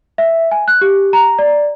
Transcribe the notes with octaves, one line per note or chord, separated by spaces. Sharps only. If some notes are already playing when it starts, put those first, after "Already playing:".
E5
G#5
F#6
G4
A#5
D5